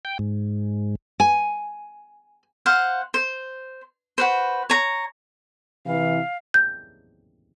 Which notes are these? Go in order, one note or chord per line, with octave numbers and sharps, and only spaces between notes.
G5
G#2
G#5
C5 F5 F#5
C5
F#4 B4 C5
C#5 A#5
C3 E3 F5
G6